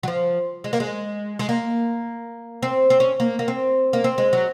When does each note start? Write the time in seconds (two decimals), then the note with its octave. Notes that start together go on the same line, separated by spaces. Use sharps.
0.03 F#3
0.08 F3
0.64 G#3
0.73 A#3
0.80 G#3
1.39 G#3
1.49 A#3
2.63 C4
2.90 C4
3.00 C#4
3.20 A#3
3.39 A#3
3.48 C4
3.93 A#3
4.04 C4
4.18 G#3
4.33 F#3